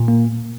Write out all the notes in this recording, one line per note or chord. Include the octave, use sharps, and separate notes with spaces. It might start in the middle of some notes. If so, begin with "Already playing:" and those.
Already playing: A#2
A#3